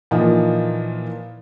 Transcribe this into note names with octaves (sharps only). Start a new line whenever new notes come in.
A#2 E3 F3 D#4